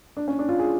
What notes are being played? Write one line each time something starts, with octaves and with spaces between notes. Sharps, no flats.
D4
C#4
D4
F4
G#4